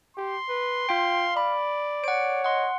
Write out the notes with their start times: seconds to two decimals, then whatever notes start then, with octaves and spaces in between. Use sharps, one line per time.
0.17 G4 C6
0.49 B4
0.89 F4 F5 G5
1.37 D5 B5
2.04 C#5 F#5 D7
2.44 D#5 F#5 C6